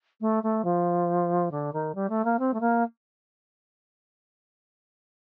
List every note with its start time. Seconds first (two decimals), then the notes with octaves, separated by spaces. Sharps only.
0.21 A3
0.43 A3
0.64 F3
1.51 D3
1.73 D#3
1.95 G3
2.09 A3
2.24 A#3
2.39 C4
2.53 A3
2.60 A#3